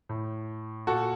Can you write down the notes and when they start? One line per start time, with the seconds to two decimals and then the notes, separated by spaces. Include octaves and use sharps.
0.09 A2
0.87 A#2 F#4 A4